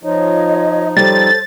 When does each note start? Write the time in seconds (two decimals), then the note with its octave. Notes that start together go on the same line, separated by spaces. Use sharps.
0.03 F3 D#4 F4 C#5 D#5
0.97 G3 A4 C5 C#5 A6